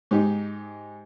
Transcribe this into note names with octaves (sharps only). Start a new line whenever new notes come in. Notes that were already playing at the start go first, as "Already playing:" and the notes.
G#2 D#4 G4